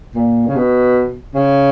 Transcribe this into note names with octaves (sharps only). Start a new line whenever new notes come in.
A#2
C#3
B2
C#3